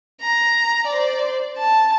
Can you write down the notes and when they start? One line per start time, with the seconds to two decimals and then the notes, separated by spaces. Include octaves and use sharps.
0.22 A#5
0.87 C5 D5
1.58 A5